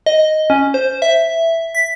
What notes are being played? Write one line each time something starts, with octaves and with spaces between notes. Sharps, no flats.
D#5
C#4
C5
E5
B6